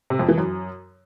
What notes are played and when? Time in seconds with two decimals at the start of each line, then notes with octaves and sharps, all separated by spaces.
0.10 C3
0.19 F2
0.29 E3
0.38 F#2